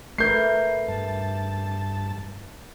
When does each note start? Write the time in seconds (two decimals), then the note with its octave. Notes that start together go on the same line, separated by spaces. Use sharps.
0.18 A3 A#4 B4 G6 C7
0.88 G2 A5